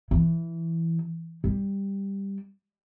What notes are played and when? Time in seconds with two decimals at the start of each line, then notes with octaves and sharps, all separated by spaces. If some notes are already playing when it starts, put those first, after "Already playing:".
0.11 E3
1.44 G3